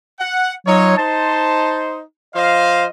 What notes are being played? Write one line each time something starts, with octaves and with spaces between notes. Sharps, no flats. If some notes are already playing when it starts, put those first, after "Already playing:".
F#5
F#3 D#4 F4 C#5
D#4 C5 A5
F3 C5 D#5 F5